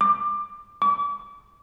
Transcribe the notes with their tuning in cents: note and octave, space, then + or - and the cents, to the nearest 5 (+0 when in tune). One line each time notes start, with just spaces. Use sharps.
D6 +20
D6 -35